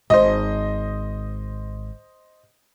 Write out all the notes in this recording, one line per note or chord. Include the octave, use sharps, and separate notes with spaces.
G#1 C5 D#5